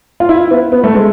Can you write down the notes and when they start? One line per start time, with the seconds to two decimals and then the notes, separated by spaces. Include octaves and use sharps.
0.20 F4
0.29 E4
0.51 B3
0.72 B3
0.84 A3
0.95 G#3